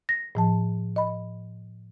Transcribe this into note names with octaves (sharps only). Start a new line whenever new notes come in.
A#6
A2 F3 A5
D#5 B5